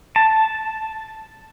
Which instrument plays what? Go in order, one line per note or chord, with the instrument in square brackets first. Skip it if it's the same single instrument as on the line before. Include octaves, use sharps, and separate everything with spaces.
[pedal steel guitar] A5